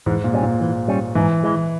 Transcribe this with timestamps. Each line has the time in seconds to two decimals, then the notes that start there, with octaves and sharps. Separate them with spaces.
0.06 G#2 E3
0.24 A#2
0.33 G3 C#4
0.43 A#2
0.61 E3
0.88 G3 C#4
1.15 G#2 E3
1.43 E3 G#3